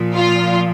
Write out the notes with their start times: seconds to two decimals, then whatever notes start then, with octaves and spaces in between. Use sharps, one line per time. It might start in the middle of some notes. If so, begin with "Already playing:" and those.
Already playing: A#2 F3
0.15 F4